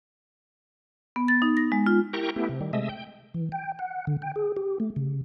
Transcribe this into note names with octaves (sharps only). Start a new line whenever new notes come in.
B3
A6
D#4
A#6
G#3
F4
E4 G4 A#4 G5 A#5 C#6
A3 B3 E4 G4
C3
D#3 G3
C3 G#3 A3 D#5 E5
G5
E3
G5
F#5
D3
G5
G#4
G4
A3
C#3